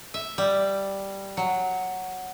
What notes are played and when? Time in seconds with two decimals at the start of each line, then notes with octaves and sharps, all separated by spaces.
0.14 E5
0.38 G3
1.37 F#3